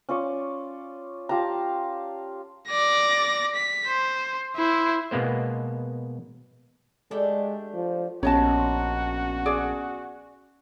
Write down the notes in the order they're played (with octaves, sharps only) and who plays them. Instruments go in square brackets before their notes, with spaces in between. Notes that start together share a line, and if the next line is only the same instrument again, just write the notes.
[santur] C#4 F4 D5 C#6
F4 G4 A5 A#5
[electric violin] D5 A#6
B6
C5
E4 C5
[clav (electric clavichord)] B2 G#3 A#3 B3 C5
[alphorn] G#3 [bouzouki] A3 D4 G4
[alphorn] F3
[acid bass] A#1 [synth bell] B3 C#4 [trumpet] F#4 [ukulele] C#5 D#5 A5
[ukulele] G#4 D5